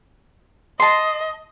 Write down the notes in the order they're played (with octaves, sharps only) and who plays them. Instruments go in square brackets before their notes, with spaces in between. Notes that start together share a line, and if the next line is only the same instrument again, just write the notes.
[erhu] D#5 [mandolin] A5 C6